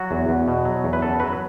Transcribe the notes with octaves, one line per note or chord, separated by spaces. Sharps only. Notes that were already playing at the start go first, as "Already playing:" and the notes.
Already playing: F#3 F#4
E2
E2
B2
F#3
E2
B4
F#2 A4
F#3 B4